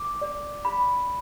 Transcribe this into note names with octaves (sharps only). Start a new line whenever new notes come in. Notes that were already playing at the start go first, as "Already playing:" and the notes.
Already playing: D6
D5
B5